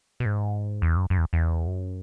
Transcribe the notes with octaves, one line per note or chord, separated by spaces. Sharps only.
B2
G#2
E2
F#2
F#2
E2
E2
F#2